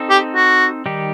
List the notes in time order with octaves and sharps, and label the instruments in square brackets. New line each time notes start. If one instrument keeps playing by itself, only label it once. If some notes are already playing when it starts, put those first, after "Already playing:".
Already playing: [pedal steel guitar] C4 D#4 A4
[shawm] G4
F#4
[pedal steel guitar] D#3 G3 D#4 G4